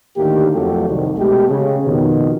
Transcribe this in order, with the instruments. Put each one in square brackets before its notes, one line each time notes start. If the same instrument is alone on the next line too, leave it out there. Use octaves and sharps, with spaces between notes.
[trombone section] D2 A2 D#3 A#3 G4
F2 F#3 A3 F#4 G4 A4
C2 D#3
B2 G#3 A3 G4
C#3
F2 B2 D#3